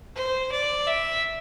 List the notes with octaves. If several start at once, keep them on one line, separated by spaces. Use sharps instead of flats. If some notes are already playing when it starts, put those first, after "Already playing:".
C5
D5
E5